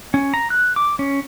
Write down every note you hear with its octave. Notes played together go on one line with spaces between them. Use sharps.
C#4
A#5
F#6
D6
C#4